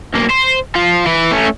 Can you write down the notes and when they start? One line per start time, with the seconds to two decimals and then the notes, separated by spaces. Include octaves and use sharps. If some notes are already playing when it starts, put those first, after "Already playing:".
0.14 B1 A#3
0.30 C5
0.75 F3 F4
1.06 E3 E4
1.31 A3 C#4